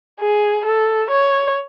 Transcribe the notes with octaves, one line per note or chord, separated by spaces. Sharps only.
G#4
A4
C#5